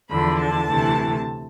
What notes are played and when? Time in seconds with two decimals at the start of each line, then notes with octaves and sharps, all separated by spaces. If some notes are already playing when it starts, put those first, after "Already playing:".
0.11 E2 D3 F3 B5
0.38 A5
0.67 D2 C3 E3 A3